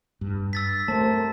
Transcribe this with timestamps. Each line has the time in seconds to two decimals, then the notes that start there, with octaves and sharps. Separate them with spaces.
0.21 G2
0.53 E6 A6 B6
0.88 C3 A3 A#4 C5 A5